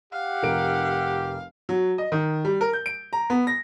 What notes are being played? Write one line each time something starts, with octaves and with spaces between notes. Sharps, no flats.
G4 F5 F#5
F1 A#4 D7
F#3
D#5
D#3
G3
A#4
G6
D7
A#5
B3
A#6